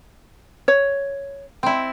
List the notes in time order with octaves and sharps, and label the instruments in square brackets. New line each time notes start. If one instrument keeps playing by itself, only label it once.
[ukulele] C#5
[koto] C4 E4